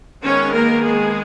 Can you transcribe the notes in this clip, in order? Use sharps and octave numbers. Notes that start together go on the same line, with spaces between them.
D#3 G#3 B3 C#4 C#5
A#3 A#4
G#3 G#4